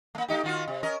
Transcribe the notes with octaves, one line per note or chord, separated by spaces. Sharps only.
A3 A#3
A3 D#4 G4
D#3 F4 F#4
C3
C#4 A#4 D#5